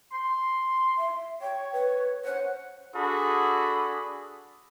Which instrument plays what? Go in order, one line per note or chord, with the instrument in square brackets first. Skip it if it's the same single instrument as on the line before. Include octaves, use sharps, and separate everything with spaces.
[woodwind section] C6
[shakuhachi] E5
[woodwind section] C#5 [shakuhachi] G5
[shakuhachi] B4
[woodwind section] C5 F#5 [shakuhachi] C#5
[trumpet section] D4 F#4 G#4 A4 B5 D#6